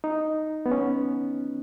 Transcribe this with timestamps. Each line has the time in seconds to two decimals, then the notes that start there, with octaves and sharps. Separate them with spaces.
0.04 D#4
0.66 B3
0.72 C#4